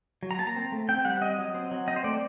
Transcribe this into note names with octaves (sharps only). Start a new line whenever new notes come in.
F#3
A#5
A#3 A5
A#5
C4
A3
C4 G5
G3 F#5
C4 D#5
F#3
C4
F#3
C4 D#5
C5
A3 D5